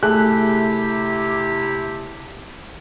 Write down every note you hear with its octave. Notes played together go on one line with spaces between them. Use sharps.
C3 A3 E4 G4 G#4 F#6